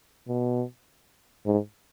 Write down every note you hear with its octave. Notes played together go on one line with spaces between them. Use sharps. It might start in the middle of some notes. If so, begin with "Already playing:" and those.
B2
G#2